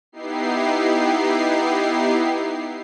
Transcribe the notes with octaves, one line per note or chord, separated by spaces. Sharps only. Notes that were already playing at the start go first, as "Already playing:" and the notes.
B3 D#4 E4 G4 C7